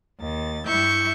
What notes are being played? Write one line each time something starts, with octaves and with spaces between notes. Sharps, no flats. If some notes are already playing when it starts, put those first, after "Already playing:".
D#2 A6
G2 G3 E4 E5 C#6 G6